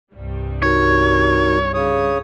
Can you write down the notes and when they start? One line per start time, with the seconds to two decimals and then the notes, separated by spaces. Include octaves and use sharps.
0.13 C2 G2 G3
0.62 D#4 F#4 A#4 C#5
1.74 C#3 C#5 D#6